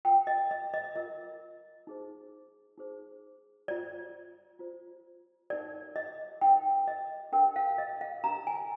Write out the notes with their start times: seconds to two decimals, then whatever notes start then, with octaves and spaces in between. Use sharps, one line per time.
0.05 F4 A#4 G5
0.27 D#5
0.51 D#5
0.74 D#5
0.95 F4 A#4 D#5
1.87 D#4 G#4 C5
2.78 D#4 G#4 C5
3.68 F4 C5 D5
4.59 F4 C5
5.50 D#4 A#4 D5
5.96 D#5
6.41 D#4 A#4 G5
6.88 D#5
7.32 D4 G4 A#4 G5
7.56 F5
7.78 D#5
8.01 F5
8.24 D4 G4 A#4 A#5
8.47 G#5